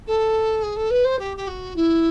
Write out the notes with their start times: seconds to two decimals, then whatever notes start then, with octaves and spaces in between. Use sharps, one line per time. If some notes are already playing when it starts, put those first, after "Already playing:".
0.06 A4
0.62 G#4
0.76 A4
0.90 B4
1.04 C5
1.18 G4
1.36 G4
1.47 F#4
1.75 E4